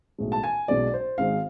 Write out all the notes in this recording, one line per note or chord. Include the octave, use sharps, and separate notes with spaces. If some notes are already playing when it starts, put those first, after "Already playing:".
B1 A2 G#3
A5
G#5
B1 B2 G#3 D5
C5
G#1 G#2 G#3 F5